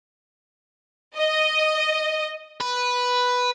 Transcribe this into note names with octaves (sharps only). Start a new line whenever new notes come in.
D#5
B4